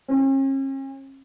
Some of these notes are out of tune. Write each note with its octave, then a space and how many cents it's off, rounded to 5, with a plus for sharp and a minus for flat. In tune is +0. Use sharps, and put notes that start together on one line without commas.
C#4 -45